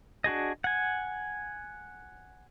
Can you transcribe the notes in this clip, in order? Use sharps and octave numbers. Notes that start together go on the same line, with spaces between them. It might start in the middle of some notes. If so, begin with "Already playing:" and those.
D4 F#4 G#4 D#5
F#5 G#5